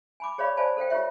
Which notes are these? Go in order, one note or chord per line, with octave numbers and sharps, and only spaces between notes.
G#5 B5 D6
G#4 C#5 D5 F5 B5 C#6
C5 D5 F5 G#5 A5 B5
A4 C5 F5 G5
F4 G4 C#5 E5